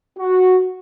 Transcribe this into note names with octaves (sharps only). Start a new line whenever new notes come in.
F#4